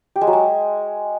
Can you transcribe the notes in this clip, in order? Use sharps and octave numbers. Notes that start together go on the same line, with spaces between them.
G4
G#3
F#3
G#3